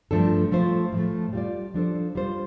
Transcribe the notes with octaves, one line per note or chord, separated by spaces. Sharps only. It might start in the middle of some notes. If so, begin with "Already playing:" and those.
G2 F3 A3 D4 A4
F3 A3 F4 C5
A2 F3 A3
G3 F4 D5
F3 D4 A4 C5
G3 F4 C5